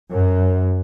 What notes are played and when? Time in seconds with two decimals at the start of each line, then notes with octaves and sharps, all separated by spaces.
0.11 F#2